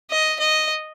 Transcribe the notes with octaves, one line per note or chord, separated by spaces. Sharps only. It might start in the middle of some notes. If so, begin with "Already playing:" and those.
D#5
D#5